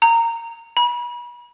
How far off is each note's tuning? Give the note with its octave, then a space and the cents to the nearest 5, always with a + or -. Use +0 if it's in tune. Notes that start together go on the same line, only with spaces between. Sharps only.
A#5 -15
B5 -35